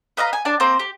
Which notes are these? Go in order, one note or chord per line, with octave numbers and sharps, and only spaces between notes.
B4 D#5 F5 A#5
G#5
D4 D5 A5
A#3 C4 C5
G4